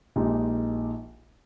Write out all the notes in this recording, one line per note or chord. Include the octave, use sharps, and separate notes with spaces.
A#1 A#2 G#3 D#4 G4